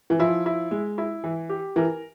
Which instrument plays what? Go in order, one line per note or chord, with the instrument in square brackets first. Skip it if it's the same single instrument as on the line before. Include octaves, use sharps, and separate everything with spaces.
[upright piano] E3
[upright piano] F3 [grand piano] E4
[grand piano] E4
G#3
E4
E3
G4
[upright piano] E3 [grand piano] A#4